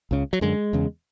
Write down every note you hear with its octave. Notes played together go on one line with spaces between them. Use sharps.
C#2 C#3
F#3
F#2 D3 G#3
E2 C#3